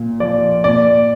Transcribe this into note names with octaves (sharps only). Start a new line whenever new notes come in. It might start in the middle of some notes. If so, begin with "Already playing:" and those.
Already playing: A#2
F3 D5
A#2 D5